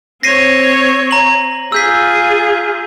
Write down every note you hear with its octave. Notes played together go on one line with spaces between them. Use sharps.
C4 C#5 A#6 C7 D#7
A#5 F#7
F4 G#4 E6 G6 B6